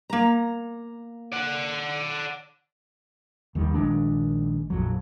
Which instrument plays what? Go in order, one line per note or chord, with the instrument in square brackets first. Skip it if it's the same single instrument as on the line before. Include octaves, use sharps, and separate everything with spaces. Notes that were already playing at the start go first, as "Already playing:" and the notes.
[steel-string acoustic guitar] A#3 A#5
[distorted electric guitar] D5 F#5
[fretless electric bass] D#2 D#3 G3
A#1 D#3 G#3 D4
A#1 F2 F#3